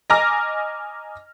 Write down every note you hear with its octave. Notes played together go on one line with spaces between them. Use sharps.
D#5 G#5 A#5 D6 F6 A#6